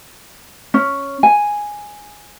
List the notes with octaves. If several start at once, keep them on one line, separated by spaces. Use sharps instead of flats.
C#4
G#5